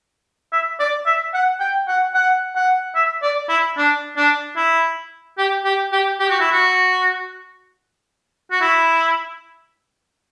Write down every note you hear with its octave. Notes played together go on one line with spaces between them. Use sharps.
E5
D5
E5
F#5
G5
F#5
F#5
F#5
E5
D5
E4
D4
D4
E4
G4
G4
G4
G4
F#4
E4
F#4
F#4
E4